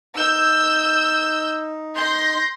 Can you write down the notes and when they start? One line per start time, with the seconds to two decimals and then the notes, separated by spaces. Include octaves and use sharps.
0.16 D#4 E6 G6
1.95 C6 G6 A#6